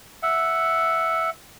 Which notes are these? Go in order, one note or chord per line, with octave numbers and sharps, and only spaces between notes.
E5 F#5